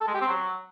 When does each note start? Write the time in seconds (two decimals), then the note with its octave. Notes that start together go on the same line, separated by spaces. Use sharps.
0.01 A4
0.08 G#3
0.14 G4
0.21 C4
0.28 F#3